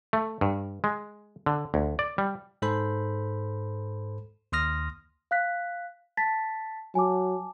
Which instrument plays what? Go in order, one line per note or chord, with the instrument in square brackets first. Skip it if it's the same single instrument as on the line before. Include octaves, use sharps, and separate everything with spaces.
[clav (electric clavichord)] A3
G2
G#3
D3
D2
D5
G3
[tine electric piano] G#2 A4 C5 B5
D#2 C6 D#6 F6 A#6
[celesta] F5 F#6 B6
A5 A6 B6
[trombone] F#3 [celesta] G#5 A5 D6